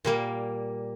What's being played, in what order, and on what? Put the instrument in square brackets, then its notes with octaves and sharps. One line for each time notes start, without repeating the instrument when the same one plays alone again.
[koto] A#2 G3 A#3